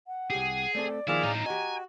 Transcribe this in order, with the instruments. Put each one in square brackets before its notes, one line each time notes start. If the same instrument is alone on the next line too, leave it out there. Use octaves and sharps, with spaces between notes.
[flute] F#5
[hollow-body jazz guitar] C2 G4 [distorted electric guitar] G#4
[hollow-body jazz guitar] A3 C4 A4 [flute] D5
[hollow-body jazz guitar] D#3 F3 A#3 [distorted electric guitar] E4 [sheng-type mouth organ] G#4 D5 F5
[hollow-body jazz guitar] A2 [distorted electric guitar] D#4 F4 [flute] A#5
[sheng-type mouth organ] F#4 [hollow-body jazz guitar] G4 D#5 [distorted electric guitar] G#5